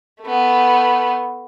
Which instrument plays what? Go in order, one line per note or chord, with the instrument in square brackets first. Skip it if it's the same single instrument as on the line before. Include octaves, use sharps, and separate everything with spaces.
[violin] A3 B3